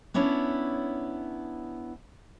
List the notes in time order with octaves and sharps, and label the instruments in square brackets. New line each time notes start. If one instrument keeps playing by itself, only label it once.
[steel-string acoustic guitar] B3 C#4 D4 E4 C#5